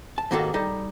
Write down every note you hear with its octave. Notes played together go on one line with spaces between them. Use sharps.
A5
D#2 G#2 D#3 A#3 F#4 A4
G3 D#4 A4